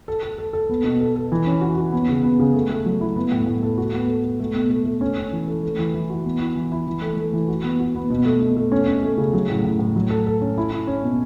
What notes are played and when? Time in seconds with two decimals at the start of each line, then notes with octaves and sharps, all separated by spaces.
0.08 A4
0.23 A4
0.38 A4
0.53 A4
0.69 B3
0.84 B2
1.01 A4
1.16 A4
1.32 E3
1.47 C#4
1.61 F#4
1.78 F#4
1.92 B3
2.09 C#3
2.23 B3
2.39 C#3
2.54 A3
2.70 A3
2.86 F#3
3.01 E4
3.16 B3
3.32 A2
3.47 A2
3.63 A4
3.78 F#4
3.94 B3
4.09 A4
4.24 A4
4.40 A3
4.56 B2
4.71 A3
4.85 A3
5.01 C#4
5.18 C#4
5.33 E3
5.47 A4
5.63 A3
5.79 E3
5.94 E3
6.10 F#4
6.24 B3
6.41 E4
6.56 E3
6.72 E4
6.87 E3
7.02 A3
7.17 A3
7.33 E3
7.48 F#4
7.64 B3
7.80 F#4
7.95 B3
8.10 B2
8.25 A3
8.42 B2
8.57 A3
8.72 C#4
8.88 C#4
9.03 A3
9.18 C#3
9.33 F#3
9.50 A2
9.65 A2
9.79 A2
9.96 F#3
10.10 A4
10.27 A4
10.41 C#4
10.58 E4
10.72 E4
10.87 C#4
11.03 B2